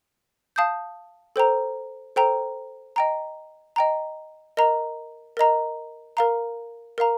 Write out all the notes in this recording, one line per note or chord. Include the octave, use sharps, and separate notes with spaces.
F5 A5 D#6 G6
A4 C5 G5 A#5
A4 C5 G5 A#5
D#5 G5 A#5
D#5 G5 A#5
A#4 D#5 A#5
A#4 D#5 A#5
A#4 F5 A#5
A#4 F5 A#5